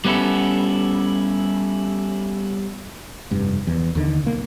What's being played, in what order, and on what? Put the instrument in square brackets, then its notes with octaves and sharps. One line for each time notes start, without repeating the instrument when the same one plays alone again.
[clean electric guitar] G3 B3 C#4 E4 A4
[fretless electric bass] F1 G2
E2
D#2 D3 D#3
B1 A#3